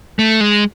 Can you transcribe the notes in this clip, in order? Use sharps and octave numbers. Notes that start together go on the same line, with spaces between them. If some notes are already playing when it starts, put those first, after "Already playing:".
A3
G#3